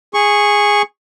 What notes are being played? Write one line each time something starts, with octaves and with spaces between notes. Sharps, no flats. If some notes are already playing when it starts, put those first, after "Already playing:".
G#4 C#6